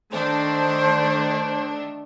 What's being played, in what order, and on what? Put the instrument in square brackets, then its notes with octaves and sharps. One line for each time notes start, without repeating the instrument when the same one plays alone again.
[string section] D#3 A3 D4 [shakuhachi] C5